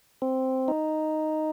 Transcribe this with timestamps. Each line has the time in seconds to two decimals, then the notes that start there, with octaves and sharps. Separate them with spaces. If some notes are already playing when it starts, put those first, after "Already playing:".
0.22 C4
0.68 D#4